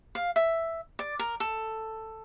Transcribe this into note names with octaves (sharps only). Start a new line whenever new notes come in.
F5
E5
D5
A#4
A4